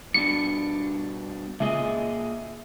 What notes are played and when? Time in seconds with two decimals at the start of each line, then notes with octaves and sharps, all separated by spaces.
0.14 G2 B2 D4 C#7
1.60 C#2 A#2 G#4 D#5 E5